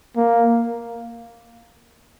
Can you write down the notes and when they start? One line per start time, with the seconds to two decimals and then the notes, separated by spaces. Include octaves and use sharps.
0.16 A#3